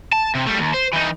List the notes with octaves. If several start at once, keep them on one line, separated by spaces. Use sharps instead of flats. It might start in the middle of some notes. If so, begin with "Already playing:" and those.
A5
C3
G3 A3
D#2
C5
E3 D#4